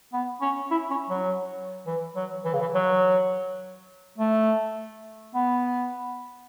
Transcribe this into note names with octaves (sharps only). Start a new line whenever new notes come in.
B3
C#4
E4
C#4
F#3
E3
F#3
E3
C#3
E3
F#3
A3
B3